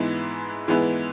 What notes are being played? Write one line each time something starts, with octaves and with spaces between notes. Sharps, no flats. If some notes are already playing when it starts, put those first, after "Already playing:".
Already playing: G#2 E3 G#3 B3 E4
G#2 E3 G#3 B3 E4